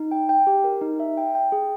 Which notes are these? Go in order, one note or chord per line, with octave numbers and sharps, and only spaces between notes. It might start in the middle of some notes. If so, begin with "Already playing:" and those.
Already playing: D#4
G5
G5
G4
A#4
D#4
E5
G5
G5
G#4